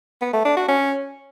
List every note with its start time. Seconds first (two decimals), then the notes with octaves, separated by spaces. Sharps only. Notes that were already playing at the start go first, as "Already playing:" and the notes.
0.21 B3
0.33 A3
0.45 D4
0.56 F#4
0.68 C#4